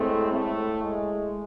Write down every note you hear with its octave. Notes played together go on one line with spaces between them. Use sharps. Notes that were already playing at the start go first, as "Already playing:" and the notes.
Already playing: A2 G#3 A3 C4
A3
G#3